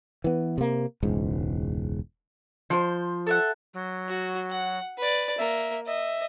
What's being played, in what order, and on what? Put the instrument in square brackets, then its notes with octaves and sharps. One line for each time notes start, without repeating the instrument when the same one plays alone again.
[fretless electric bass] E3 B3
C3 A#3
E1 C#2 G#2
[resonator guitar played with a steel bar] F3 C5
[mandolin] A4 E5 F#5
[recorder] F#3
[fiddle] F#4
F#5
B4 D5
[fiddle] A#3 [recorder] E5
[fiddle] D#5 [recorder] E5